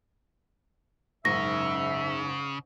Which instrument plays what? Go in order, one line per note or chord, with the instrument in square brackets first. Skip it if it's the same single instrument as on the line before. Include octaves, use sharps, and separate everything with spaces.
[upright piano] F#1 B1 G#2 [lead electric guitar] C#3 [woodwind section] E5 [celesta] A#6